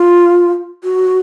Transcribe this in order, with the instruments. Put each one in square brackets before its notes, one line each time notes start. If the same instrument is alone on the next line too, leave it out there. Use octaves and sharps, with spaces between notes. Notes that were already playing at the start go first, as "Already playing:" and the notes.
Already playing: [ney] F4
F#4